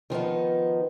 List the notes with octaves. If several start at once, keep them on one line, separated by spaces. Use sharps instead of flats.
D#3 F3 B3 D#4